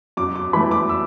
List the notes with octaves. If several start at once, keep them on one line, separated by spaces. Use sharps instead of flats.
F#2 D6
D6
E3 A3 B5
D6
E6